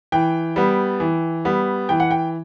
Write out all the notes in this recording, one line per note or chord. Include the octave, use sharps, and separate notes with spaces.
E3 G5
G3 B3
E3
G3 B3
E3 G5
F#5
G5